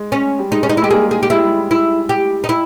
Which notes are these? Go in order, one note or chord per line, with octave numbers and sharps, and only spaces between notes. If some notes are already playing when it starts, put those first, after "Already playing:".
Already playing: G#3
C#4
G3
G#3 D#4
C#4
D#4
E4
G#3 G4
G3 A#3 G#4
G#4
G4
G#3 E4
G3
G#3
E4
G4
D#4
E4